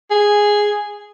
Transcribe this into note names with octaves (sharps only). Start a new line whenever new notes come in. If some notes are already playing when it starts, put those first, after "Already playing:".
G#4